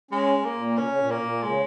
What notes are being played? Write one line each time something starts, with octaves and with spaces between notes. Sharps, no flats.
G#3 C#4
A#3
A#2
C#3 C#4
C#3
A#2
A#3
A#2
C#3 G#3